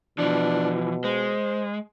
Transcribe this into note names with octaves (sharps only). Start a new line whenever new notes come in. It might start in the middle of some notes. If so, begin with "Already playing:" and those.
B2 E3 F3 D4
G#3 C5